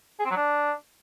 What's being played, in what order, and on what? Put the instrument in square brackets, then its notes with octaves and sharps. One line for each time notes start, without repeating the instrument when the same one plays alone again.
[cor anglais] G#4
C4
F#3
D4